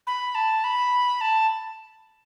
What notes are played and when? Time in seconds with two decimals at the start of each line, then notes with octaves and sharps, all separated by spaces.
0.07 B5
0.35 A5
0.64 B5
1.21 A5